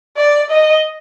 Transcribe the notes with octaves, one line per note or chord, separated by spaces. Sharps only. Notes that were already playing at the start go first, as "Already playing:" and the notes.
D5
D#5